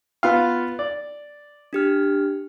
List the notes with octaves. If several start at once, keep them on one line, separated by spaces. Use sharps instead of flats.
B3 F4 F5
D5
D4 G4 F6